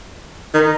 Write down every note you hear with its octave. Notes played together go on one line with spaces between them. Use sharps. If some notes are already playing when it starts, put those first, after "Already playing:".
D#3 D#4